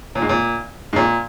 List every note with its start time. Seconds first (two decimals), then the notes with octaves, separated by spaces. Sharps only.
0.15 A#2
0.22 G#2
0.29 A#2
0.93 G#2
0.96 A#2